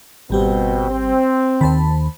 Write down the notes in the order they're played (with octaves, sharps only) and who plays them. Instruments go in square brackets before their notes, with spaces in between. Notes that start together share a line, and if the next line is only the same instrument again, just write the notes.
[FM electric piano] G#1 G3 G4 [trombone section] B2 C4
[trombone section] C4
[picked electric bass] D#2 D#3 [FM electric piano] C5 A5 B5